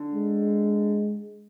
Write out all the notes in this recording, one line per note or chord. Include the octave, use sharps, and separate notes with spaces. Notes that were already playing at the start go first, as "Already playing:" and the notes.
Already playing: D3
G#3